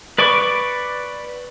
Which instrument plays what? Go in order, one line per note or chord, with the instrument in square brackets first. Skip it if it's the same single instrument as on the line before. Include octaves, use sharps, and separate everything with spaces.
[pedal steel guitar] B4 D5 B5 C#6 D6